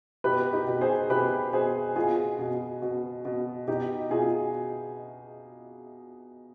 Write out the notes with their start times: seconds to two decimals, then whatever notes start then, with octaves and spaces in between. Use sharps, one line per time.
0.24 B2 G4 B4
0.53 D#4 G4
0.67 B2
0.81 G#4 C5
1.10 B2 G4 B4
1.53 B2 G#4 C5
1.96 B2 F4 G#4
2.39 B2
2.82 B2
3.25 B2
3.68 B2 D#4 G4
4.10 B2 F4 G#4